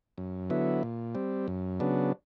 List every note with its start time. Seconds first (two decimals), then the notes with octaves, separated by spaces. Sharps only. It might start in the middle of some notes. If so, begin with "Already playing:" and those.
0.18 F#2
0.50 D3 F#3 B3 E4
0.83 A#2
1.15 G3 C4
1.48 F#2
1.80 C#3 F#3 B3 D4